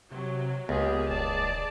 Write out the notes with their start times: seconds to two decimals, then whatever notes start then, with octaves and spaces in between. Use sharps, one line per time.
0.12 C3 F#3
0.69 C#2 A#3 B3 G4 G#4
1.10 D#1 G#4 D5 A5